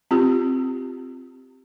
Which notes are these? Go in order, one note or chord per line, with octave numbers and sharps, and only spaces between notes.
C4 F4 G4